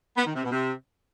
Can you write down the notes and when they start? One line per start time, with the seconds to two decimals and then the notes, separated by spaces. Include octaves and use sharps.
0.17 B3
0.25 D#3
0.34 C3
0.43 B2
0.52 C3